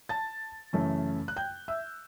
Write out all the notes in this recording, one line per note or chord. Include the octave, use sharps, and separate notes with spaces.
A5 A6
F#2 C#3 E3 A3 C#4
F#6
G5 G6
E5 E6